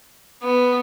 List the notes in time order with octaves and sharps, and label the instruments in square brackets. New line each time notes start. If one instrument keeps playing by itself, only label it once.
[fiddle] B3